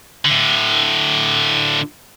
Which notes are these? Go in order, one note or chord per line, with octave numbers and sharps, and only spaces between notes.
A2 D3